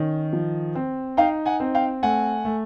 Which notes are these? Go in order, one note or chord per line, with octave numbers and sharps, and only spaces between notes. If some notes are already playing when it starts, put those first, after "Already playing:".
Already playing: D#3 C#4
F3
C4
D#4 F5 G5
F#5 G#5
C4
F5 G5
A3 F#5 G#5
A3